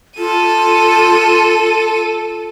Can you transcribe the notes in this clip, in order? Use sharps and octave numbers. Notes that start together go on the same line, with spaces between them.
F4 A4 D#7